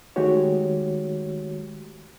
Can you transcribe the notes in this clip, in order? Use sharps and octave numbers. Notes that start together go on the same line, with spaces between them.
D#3 G#3 A3 F#4 G4 C#5